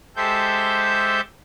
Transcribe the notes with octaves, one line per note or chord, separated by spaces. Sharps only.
G#3 G4 A4 C5 E5 G6